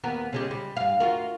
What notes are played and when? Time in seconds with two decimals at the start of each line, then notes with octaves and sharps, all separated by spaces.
0.04 D#2 B3 A#4
0.33 C#3 G#3 G4
0.51 G3
0.77 G2 F5
1.00 F4 F#4 A#4